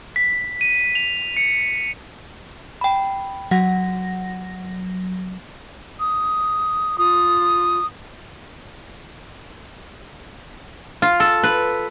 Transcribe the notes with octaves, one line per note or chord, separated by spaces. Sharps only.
B6
D#7
F7
C#7
G5 B5
F#3 F#5 A#6
D#6
F4 D#6
F4
A4
B4